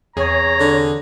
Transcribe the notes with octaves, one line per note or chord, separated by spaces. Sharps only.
E2 C3 G#4 C#5 A#5
D3